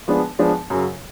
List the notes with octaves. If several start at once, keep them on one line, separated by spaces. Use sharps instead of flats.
F3 G#3 B3 D4
F3 G#3 B3 D4
F#2 C#3 F#3